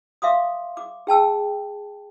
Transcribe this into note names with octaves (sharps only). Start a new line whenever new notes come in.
E5 F5 C6 D6 D#6
D6
G#4 G5 A5 E6